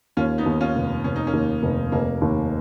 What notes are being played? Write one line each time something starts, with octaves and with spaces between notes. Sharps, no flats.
D#2 C#4 F4
B3 D#4
D#2
C#4 F4
F1
F1 C#4
D#4
A#3 C#4
D#2
F1
F1 A#3
D#2